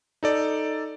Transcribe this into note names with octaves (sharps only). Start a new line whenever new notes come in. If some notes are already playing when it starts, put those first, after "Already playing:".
D#4 A4 D5